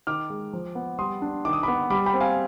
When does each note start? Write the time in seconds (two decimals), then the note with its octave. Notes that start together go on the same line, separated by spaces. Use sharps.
0.07 D#3 D6 F6
0.30 G#3
0.53 F3
0.75 B3
0.99 G3 C6 D#6
1.22 D4
1.45 D#3 D6
1.53 D#6
1.63 B3 B5 D6
1.90 G3 B5 D6
2.06 G5 B5
2.14 C4
2.20 F5 G#5